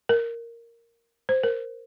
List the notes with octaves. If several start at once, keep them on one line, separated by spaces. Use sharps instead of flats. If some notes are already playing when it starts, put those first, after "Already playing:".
A#4
C5
A#4